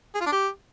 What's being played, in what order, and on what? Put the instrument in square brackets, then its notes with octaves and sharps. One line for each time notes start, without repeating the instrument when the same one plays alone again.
[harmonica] G#4
F4
D4
G4